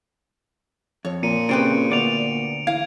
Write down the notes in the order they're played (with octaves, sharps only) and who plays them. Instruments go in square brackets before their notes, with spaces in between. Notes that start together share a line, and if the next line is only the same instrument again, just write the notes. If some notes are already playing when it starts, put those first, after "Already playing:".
[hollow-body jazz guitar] F2 [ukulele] C#5
[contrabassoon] A#2 [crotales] C#7 D#7
[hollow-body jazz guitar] C#3 C4 [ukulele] F4 G4 B4 [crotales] D7
[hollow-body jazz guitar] D2 B3 D5 [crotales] D7 F7
[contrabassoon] E3 [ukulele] F5 [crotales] G#6